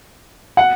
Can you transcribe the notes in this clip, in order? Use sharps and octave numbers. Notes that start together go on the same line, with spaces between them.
F#5